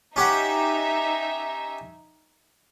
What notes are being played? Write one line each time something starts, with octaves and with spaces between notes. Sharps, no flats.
C#4 D#4 G4 E5 F#5